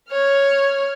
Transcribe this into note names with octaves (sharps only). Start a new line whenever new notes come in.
C#5 F6